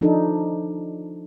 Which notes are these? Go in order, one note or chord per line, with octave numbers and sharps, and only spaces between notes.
F3 D4 D#4 A4